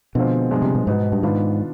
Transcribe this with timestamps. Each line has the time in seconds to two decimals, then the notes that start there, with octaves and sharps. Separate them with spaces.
0.15 B2 D3 F3 G#3 C4 F4
0.51 G2 F3 G#3 D4
0.62 C3
0.75 B2
0.87 G#2 B2 B3 D#4 B4
1.12 G2
1.23 G#2 D#3 B3 D4 F4 B4